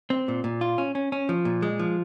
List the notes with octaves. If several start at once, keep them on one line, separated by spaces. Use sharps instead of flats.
C4
A#2
A#2
F4
C#4
C#4
C#4
F3
A#2
G#3
F3